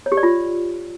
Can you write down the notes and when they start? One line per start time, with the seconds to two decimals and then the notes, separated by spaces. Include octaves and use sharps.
0.06 C#5
0.12 G4
0.17 D5
0.23 F4